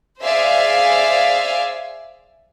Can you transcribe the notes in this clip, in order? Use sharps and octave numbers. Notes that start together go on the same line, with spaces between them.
G#4 C5 D5 E5 F5 G#5